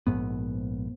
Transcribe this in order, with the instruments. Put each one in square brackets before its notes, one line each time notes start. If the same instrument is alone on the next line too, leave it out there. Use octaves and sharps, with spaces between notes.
[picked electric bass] A#1 G#2 B3